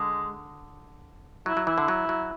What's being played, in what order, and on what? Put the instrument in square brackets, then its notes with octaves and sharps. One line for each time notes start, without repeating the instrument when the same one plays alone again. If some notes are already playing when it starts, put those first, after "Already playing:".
Already playing: [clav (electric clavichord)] D3 [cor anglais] G#3
[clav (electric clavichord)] F#3 [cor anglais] E4
[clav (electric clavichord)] F#3
[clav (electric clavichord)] E3 [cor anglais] E4
[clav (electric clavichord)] D3
F#3
F#3